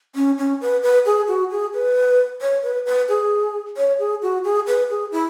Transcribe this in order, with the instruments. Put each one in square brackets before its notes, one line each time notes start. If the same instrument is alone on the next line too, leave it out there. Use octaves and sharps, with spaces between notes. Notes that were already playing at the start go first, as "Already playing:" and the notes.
[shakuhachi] C#4
C#4
B4
B4
G#4
F#4
G#4
B4
C#5
B4
B4
G#4
C#5
G#4
F#4
G#4
B4
G#4
E4